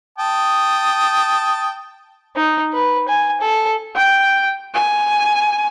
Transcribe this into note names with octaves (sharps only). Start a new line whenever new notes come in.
G5 A5 D#6
D#4
B4
G#5
A4
G5
G#5